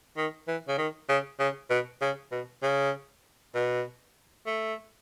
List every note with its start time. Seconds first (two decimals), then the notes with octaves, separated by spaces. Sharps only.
0.17 D#3
0.47 E3
0.68 C#3
0.78 D#3
1.09 C#3
1.39 C#3
1.70 B2
2.01 C#3
2.32 B2
2.63 C#3
3.55 B2
4.47 A3